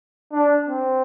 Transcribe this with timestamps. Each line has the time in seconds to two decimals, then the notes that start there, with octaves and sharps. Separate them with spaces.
0.32 D4
0.69 C4